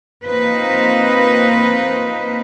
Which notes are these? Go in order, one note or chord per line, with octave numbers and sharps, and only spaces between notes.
A#3 C4 D#4 F4 B4 C5